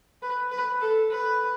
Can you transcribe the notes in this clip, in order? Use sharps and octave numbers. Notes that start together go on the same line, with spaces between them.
B4
B4
A4
B4